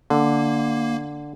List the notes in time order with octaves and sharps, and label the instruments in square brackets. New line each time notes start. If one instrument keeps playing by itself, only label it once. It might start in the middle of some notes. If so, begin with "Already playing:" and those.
[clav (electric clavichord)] D3 [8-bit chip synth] A#3